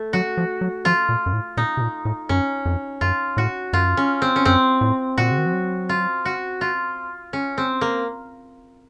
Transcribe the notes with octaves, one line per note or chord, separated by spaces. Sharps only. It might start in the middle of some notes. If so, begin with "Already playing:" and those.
Already playing: A3
F#3 F#4
F3
F#3
F3 F4
A#2
F#2
A2
A#2 D#4
C3
A#2
A2
F#2 C#4
F2
F#2 F4
A2 F#4
F#2 F4
C#4
C4
C#4
F#2 C4
A2
A#2 F#4
C#3
D#3
F3
F#3
F4
F#4
F4
C#4
C4
A#3